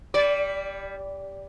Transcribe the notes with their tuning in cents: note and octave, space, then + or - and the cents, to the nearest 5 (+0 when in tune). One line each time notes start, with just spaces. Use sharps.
G3 +10 D5 -20